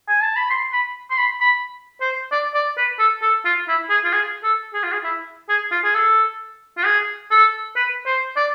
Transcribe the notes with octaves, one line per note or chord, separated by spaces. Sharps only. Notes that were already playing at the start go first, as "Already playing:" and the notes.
G#5
A5
B5
C6
B5
C6
B5
B5
C5
D5
D5
B4
A4
A4
F4
E4
G#4
F4
G#4
A4
G#4
F4
G#4
E4
G#4
F4
G#4
A4
F4
G#4
A4
B4
C5
D5